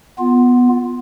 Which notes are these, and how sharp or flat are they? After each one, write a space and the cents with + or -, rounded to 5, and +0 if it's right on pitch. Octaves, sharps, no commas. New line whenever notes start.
B3 +0 F4 +0